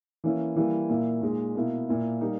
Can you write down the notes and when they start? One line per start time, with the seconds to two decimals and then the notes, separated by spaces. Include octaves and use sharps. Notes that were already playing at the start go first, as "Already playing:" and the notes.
0.24 E3 A#3 C#4 E4
0.56 E3 G3 A#3 E4
0.90 A#2 A#3 E4
1.22 A#2 G#3 D#4
1.55 B2 A#3 E4
1.88 A#2 A#3 E4
2.21 G3 A#3 D#4